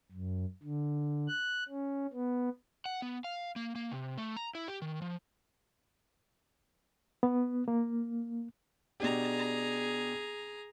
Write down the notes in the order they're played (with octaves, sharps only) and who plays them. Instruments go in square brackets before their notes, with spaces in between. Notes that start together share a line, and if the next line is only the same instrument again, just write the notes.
[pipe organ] F#2
D3
F#6
C#4
B3
[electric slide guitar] F#5
B3
F5
A#3
A#3
C3
A3
A#5
E4
G4
D#3
F3
[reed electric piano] B3
A#3
[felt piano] B2 D4 G4 [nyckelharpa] G#4 A#5